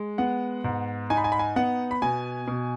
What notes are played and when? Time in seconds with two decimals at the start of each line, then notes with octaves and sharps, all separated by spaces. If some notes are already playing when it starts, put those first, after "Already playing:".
Already playing: G#3
0.18 B3 F#5
0.64 G#2
1.10 D#4 G#5
1.17 B5
1.24 G#5
1.32 B5
1.39 G#5
1.56 B3 F#5
1.91 B5
2.02 B2 G#5
2.48 B2